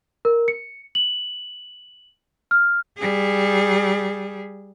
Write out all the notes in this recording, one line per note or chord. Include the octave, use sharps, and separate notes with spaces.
A#4
C#7
F#7
F6
G3 G#4